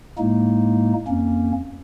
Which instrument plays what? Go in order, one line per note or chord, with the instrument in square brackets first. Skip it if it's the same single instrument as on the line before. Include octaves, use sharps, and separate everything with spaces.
[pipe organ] A2 G#3 A#3 D#4
F2 A#3 C#4